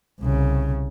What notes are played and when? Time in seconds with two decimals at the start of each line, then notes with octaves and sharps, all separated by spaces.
0.21 C2 C#3